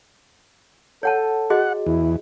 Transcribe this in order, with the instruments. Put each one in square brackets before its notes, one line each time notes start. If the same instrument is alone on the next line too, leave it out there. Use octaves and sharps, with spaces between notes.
[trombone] A4 [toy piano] C#5 F#5 A5
[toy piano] F#4 G#4 D#5 [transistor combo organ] F#5
[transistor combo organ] E2 [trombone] E4